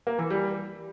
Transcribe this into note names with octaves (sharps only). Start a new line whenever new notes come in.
A#3
E3
G3